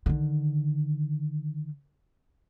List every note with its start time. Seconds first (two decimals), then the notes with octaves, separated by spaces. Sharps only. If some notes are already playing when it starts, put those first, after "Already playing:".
0.06 D3 D#3